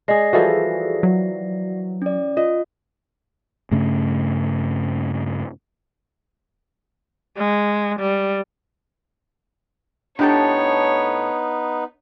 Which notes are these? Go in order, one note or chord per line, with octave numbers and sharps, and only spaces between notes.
G#3 G#4 D5 A#6 C7
E3 F3 G3 F#4 G#4 A4
F#3
C#4 D5
F4 D#5
G2 C#3 A3 C#4
G#3
G3
A2 B3 D4 D#4 G4 A4 B4 C#5